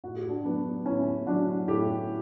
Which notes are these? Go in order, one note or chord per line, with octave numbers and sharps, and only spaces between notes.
A2 F#4
G4
D4 F#4
F#3 B3 D4
A2 C#4 E4
F#3 D4 F#4
A2 E4 G4